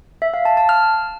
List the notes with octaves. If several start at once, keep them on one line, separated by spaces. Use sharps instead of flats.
E5
F5
A5
A5
F6